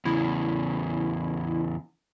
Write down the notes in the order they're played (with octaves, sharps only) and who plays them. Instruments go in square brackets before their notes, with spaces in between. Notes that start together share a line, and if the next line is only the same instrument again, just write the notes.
[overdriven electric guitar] E2 C#3 [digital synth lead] E4